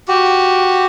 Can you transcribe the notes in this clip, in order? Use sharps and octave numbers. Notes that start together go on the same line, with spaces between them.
F#4 G4